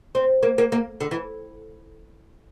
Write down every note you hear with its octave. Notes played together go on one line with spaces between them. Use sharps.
C4
A#3
A#3
A#3
D3
E3